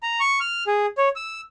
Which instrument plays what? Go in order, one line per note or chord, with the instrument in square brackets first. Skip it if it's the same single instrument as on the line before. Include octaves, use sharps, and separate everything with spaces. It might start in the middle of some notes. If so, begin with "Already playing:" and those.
[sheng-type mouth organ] A#5
C#6
F6
G#4
C#5
E6